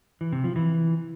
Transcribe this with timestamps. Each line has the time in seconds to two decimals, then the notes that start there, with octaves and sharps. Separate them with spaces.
0.21 E3
0.32 C3
0.44 F3
0.56 E3